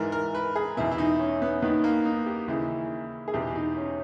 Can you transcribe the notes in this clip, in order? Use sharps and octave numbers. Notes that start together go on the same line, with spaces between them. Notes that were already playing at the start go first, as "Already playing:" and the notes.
Already playing: G#2 E3 A#4
A#4
B4
G#4
E2 B2 E4
E4
D#4
C#4
B3
D#2 D#3 B3
A#3
D#4
G4
D#2 C#3 E3 E4
G#4
E2 B2 G4
D#4
C#4